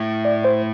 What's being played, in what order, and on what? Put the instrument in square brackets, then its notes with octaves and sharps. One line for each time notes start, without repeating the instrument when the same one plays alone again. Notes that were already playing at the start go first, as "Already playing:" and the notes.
Already playing: [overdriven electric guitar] A2
[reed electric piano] D5
C5